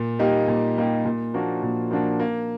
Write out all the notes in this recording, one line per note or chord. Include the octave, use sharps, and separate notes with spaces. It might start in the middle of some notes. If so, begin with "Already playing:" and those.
Already playing: A#2
G3 A#3 D#4 G4
A#2
G3 A#3 D#4 G4
A#2
F3 A#3 D4 F#4
A#2
F3 A#3 D4 F#4
A#3